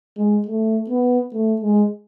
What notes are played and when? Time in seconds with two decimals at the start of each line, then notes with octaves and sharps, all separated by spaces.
0.18 G#3
0.47 A3
0.90 B3
1.33 A3
1.62 G#3